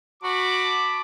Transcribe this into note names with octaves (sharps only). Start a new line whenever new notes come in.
F#4 A5 B5 D6